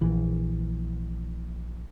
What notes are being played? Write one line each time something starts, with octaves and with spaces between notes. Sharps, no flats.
A#1 E3